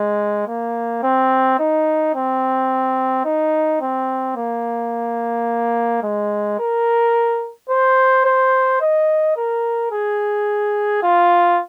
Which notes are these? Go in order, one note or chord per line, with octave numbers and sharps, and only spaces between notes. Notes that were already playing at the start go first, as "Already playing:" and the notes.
Already playing: G#3
A#3
C4
D#4
C4
D#4
C4
A#3
G#3
A#4
C5
C5
D#5
A#4
G#4
F4